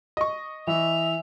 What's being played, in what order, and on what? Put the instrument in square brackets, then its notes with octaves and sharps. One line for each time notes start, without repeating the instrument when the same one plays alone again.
[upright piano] D#5 C#6
[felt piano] E3 [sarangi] E5 [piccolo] F7